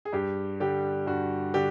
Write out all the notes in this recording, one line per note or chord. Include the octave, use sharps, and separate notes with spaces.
G#4
G2 G4
D3 G3 G4
G2 F#4
D3 G4